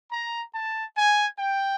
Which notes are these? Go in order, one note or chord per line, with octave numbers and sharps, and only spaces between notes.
A#5
A5
G#5
G5